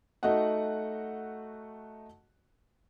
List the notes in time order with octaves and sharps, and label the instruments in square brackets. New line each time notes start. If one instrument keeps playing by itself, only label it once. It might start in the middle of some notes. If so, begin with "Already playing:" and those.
[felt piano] A3 D#4 F#4 D#5 F#5